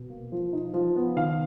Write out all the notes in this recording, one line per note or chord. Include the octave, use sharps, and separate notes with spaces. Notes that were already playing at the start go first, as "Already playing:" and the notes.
Already playing: B2
A#3
F3
D#4
F3
B3
D#3 F5